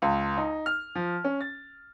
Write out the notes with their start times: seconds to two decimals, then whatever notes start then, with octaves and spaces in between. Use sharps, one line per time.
0.02 C#2
0.37 D#4
0.66 F6
0.95 F3
1.25 C#4
1.41 A6